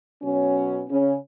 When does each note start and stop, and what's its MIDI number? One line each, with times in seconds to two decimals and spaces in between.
0.23 0.82 47
0.23 0.82 54
0.23 0.82 61
0.89 1.15 49
0.89 1.15 61